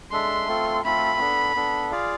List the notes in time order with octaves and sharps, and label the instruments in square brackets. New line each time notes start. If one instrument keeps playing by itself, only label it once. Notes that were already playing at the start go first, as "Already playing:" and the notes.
[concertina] G#3 D4 A4 E5 [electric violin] C6
[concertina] A3 C4 F4 A4
[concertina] A3 C4 F4 A4 [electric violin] B5
[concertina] B3 D4 A4
B3 D4 A4
F4 G#4 D5 F5